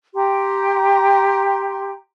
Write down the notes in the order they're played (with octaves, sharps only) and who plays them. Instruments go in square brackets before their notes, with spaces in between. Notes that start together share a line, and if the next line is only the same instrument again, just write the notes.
[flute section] G4 G5 A#5 C6